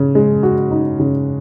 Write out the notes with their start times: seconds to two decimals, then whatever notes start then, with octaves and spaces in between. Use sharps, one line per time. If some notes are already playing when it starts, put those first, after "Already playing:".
Already playing: C#3
0.15 G#3
0.43 F#4
0.71 D#4
1.00 C#3